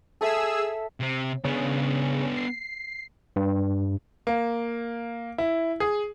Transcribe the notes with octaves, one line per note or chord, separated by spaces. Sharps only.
G#4 A4 E5 D#6 E6
C3 C4
C#3 B3 D4
C7
G2
A#3
E4
G#4